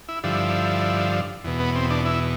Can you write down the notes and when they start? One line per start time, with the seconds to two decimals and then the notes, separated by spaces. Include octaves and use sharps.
0.09 E4
0.24 G2 D3 F3 E4
1.44 E2 B2
1.60 B3
1.75 C4
1.91 D4
2.05 E4